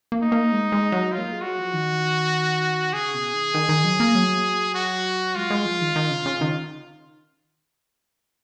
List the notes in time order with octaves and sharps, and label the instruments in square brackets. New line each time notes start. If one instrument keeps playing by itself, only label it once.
[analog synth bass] A#3
[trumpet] D#4
[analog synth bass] A#3
G#3
G#3
F#3
[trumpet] F4
[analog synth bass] A#3
G#3
[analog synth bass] F#3 [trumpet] F#4
[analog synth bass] F3
D#3
[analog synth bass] C#3 [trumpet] G#4
[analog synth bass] B2
D#3
D#3
D#3
F#3
A#3
F#3
[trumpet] F#4
[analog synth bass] G#3 [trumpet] F4
[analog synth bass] G#3
F3
D#3
D#3
C#3
C#3
D#3